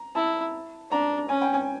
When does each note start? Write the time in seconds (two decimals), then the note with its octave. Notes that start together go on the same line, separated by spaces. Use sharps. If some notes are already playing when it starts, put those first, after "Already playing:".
Already playing: A#5
0.15 E4 A5
0.92 D4 A#5
1.29 C#4 G#5
1.41 G5
1.54 G#5